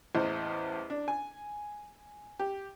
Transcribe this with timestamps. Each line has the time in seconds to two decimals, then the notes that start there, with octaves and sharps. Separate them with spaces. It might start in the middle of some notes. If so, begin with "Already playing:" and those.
0.15 A1 E2 C5 D#5
0.90 D4
1.08 G#5
2.39 G4